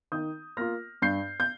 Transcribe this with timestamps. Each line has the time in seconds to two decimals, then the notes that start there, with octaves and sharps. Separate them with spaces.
0.12 D#3 D#6 G6
0.57 A#3 F4 F6 A#6
1.02 G2 G6 C7
1.40 G6